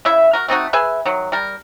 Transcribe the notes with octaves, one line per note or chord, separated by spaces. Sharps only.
C#3 E4 E5
F#4 A#4
A3 C4 D#4 F#4
G#4 B4 E5 G#5
D#3 F#3
G3 A#4